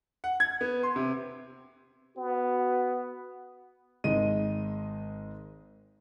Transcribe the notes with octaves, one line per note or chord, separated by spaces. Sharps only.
F#5
G#6
B3
C6
C3
B3 F#4
G#1 G#3 D#5 D#7